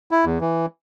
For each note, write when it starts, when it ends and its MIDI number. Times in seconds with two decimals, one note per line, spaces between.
0.11 0.25 64
0.25 0.38 40
0.41 0.66 52